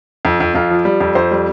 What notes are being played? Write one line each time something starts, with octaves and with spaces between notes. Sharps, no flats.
F2
F2
F2 F4
F3
G3
F2
F2 C5
G3